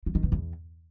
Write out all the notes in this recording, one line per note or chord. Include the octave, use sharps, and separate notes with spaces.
F3
D#3
B2
E2